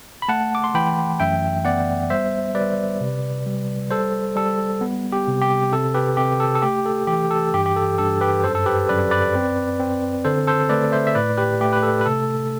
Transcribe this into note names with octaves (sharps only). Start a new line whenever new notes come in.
B5
A3 F#5 A5
D6
C6
E3 G5 B5
F#2 E5 G5
B3 D5 F#5
G3 C5 E5
G3 B4 D5
C3
G3
G3 A4 C5
G3 A4
B3
G4
C3
G4
C3 A4
G4 B4
C3 G4
A4
A4
A3 G4
A4
E3 G4
A4
G2 G4
G4
A4
G2 A4
G4 B4
F#2 A4 C5
A4
G4 B4
F#2 B4 D5
B4 D5
C4
C4
D3 A4 C5
A4 C5
A3 B4 D5
C5 E5
E5
A2 B4 D5
G4 B4
A3 G4
B4
A4
B4
C3 A4